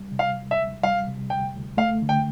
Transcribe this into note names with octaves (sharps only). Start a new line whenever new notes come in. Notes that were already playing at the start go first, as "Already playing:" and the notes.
Already playing: G3
C3
F5
D2
E5
D2
G3 F5
C3
D2 G5
D2
A3 F5
D3
G5